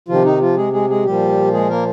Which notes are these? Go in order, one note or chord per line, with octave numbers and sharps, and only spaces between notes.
C3 D#3 F3 F4
D#3 D#4
F3 F4
G#3 G#4
G#3 G#4
G#3 G#4
A#2 F3 G3 G4
G#3 G#4
A#3 A#4